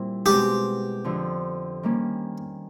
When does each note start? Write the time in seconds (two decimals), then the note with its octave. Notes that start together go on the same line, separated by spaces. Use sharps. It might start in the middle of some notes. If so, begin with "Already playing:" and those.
Already playing: A#2 G3 C4 E4
0.26 B2 G#3 C4 G4
1.04 F2 D3 F3
1.83 D#3 G3 A#3 C#4